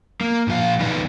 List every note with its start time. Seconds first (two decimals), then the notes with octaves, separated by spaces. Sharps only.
0.21 A#3
0.48 A#2 F3 F4 F5
0.80 D#3 E3 B3 D#4 B4 D5